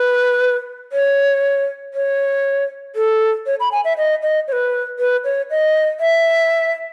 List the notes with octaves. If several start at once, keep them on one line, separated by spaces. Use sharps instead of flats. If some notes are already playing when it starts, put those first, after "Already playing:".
Already playing: B4
C#5
C#5
A4
C#5
B5
G#5
E5
D#5
D#5
C#5
B4
B4
C#5
D#5
E5